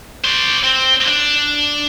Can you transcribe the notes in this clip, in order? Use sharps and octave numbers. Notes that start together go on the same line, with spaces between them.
C5 D5
C4
D4